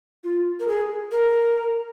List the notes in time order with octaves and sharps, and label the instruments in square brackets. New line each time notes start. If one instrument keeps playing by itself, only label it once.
[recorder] F4
A#4
G#4
A#4